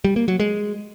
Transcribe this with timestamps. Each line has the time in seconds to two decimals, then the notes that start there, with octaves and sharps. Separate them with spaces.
0.04 G3
0.16 A#3
0.28 F#3
0.40 G#3